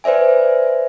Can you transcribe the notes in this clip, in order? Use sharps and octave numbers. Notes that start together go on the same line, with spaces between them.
B4 C5 D5 E5 G#5